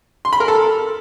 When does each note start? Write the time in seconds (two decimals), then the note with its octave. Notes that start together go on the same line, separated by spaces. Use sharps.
0.25 C6
0.33 B5
0.40 A#4
0.48 A4